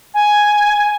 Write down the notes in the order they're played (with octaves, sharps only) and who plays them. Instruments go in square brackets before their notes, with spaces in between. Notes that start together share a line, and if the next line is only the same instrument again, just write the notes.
[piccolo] G#5